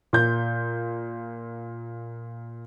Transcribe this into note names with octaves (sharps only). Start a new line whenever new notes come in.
A#2 G6